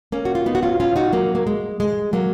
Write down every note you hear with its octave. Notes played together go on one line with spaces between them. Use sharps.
A#3 C#4
F#4
F4
B3 D#4
F#4
C#4 F4
C#4 F4
D#4 F#4
F#3 A#3
A#3
G#3
G#3
F#3 A#3